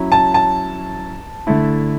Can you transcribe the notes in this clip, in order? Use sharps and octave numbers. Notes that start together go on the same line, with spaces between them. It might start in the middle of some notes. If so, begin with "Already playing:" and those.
Already playing: F#3 C#4 E4
A5
A5
D3 A3 E4